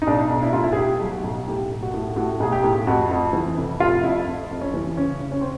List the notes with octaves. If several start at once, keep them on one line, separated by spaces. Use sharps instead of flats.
D#4
B1 D4
B1
E4
A2 F4
E4
G#4
B1 G4
F#3
F#4
B1
A2 G4
B1
F#4
A2
A2 F#4
B1 G#4
G4
A2
F2 F#4
F2
E3
F1
F1 F4
F2 E4
F2
F2
C#4
E3
C#3 C#4
C#3
C#4
C4